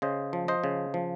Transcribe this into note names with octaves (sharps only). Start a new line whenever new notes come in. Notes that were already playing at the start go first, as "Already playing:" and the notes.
C#3 C5 D#5
F3
C5 D#5
C#3
F3